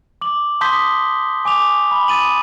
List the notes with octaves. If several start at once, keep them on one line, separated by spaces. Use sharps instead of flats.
D6 F#7
A5 C6 D#6 G6 B6 G7
G#5 D6 F7
B5
D#6 A6 D#7 F#7